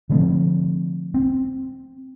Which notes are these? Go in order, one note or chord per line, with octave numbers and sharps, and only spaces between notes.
D3 F3 A3 C4
C4